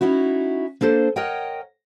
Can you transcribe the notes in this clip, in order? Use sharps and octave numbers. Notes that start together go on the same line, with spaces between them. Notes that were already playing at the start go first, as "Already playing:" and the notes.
C#4 D#4 E4 F#4
A#3 D4 A4 C5
A#4 C#5 D#5 F#5 G5